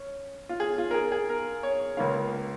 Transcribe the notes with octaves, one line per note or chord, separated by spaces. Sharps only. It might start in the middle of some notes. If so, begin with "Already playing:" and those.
Already playing: C#4
F4
G#4
F4
A#4
G#4
G#4
A#4
C#5
C#2 C#3 A#3 C#4 F5